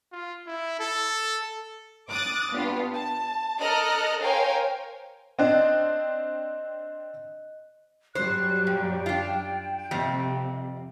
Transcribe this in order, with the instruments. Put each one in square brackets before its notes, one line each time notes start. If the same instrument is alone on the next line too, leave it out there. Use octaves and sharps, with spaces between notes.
[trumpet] F4
E4
A4
[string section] D6 D#6 F#6 A6
G2 B3 F4
A5
A4 A#4 D#5 A#5 F6 F#6
A#4 C5 C#5 F5 G5 G#5
[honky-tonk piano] C4 D4 [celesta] D#5 F#6
[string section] F#2 F#3 G3 [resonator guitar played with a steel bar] C5 [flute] F#6
[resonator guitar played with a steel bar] A#2 [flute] G5
[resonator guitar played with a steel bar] D4 F4
[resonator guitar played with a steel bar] F2 G3 C4 [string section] C3